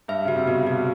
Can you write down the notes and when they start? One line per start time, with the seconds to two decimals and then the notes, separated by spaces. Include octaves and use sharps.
0.08 G2 E5
0.25 C#3 F#4
0.36 C3
0.47 B2 F#4
0.67 F#4